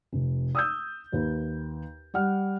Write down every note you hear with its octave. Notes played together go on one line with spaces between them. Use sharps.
F1
D#6 E6 G6
D#2 B4
G3 F#5 F6